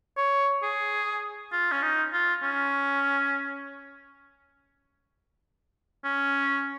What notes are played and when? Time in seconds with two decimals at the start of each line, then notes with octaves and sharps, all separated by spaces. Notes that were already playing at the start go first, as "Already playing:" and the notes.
0.17 C#5
0.63 G#4
1.52 F4
1.72 C#4
1.82 D#4
2.13 F4
2.43 C#4
6.04 C#4